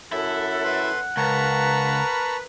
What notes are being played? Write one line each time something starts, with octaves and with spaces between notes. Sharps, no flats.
F#2 E4 A4 F#5
B4 B5 C6
C#2 A#4 B4 A5 A#5 C#6